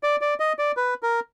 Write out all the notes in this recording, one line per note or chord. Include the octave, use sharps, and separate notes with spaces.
D5
D5
D#5
D5
B4
A#4